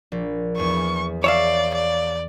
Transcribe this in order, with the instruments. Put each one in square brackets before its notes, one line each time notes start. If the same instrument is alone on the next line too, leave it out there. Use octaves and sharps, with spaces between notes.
[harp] A#1
[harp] E2 G#4 [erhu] C#6
[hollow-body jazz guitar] C#5 E5 F5 [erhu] D5
[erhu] D5